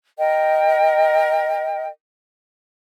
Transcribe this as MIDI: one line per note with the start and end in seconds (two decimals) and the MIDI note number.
0.18 1.88 70
0.18 1.88 75
0.18 1.88 79